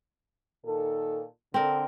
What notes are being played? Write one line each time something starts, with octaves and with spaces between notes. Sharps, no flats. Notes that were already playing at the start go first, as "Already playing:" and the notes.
A#2 D#3 A4
D3 C4 A#4